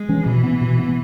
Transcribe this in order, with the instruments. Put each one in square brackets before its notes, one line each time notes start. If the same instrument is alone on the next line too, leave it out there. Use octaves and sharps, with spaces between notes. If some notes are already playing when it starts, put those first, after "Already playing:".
Already playing: [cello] G#3
[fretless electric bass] E3 C#4
[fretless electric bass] B2 [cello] E3
[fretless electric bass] B3
B2
B3